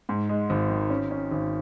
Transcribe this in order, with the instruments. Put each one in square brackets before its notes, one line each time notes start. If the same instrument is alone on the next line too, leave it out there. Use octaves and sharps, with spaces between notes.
[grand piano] G#2
G#3
G#1
D#3
C#4
C#4
G#1